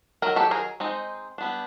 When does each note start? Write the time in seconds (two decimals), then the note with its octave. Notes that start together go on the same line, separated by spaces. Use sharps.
0.22 D#3 F#3 A#4
0.36 G4 A4
0.51 G#4 A#4
0.80 G#3 C4 D#4
1.38 G3 B3 D4